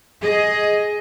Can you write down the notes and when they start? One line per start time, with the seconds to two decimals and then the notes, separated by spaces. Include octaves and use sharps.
0.22 G#4 D#5